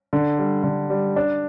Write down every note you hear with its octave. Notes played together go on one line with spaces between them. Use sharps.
D3
G3
D3
G3
D4